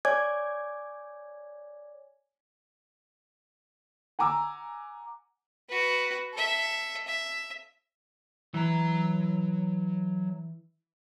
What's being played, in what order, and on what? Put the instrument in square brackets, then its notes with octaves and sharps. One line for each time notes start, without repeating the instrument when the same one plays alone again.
[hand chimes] C#5 D5 G#5 D6 G#6
[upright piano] F#5 G#5 A#5 D6 E6
[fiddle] F#4 B4
A4 E5
E5
[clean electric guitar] E3 [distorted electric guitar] F#3 A#5